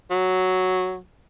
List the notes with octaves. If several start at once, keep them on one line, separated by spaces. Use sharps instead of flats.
F#3